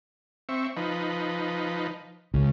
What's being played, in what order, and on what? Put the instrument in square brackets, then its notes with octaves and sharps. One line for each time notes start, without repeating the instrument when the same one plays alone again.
[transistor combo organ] C4 E5 C#6
F3 D#4 B4
[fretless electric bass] C#2 [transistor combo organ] C#3